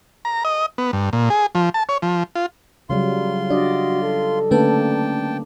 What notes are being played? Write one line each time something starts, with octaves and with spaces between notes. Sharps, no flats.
A#5
D#5
B3
G2
A#2
G#4
F3
A5
C#5
F3
F4
C#3 F#3 G3 F4 C6
D4 F#4 D5 D#5
A4
D3 A3 A#3 C#4 D4 B4 G5 A5